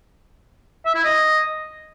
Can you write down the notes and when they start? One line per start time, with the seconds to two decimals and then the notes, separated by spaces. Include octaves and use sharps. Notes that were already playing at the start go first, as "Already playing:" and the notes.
0.85 E5
0.95 E4
1.04 D#5